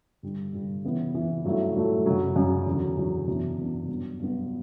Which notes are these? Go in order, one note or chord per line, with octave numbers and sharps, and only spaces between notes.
G2 D3 G3
G2 D3 G3
C#3 E3 B3
C#3 E3 B3
G2 F#3 A3 E4
G2 F#3 A3 E4
F#2 C#3 F#3
F#2 C#3 F#3
E2 D3 F#3
E2 D3 F#3
F#2 E3 B3 D4
F#2 E3 B3 D4
G2 F#3 B3
G2 F#3 B3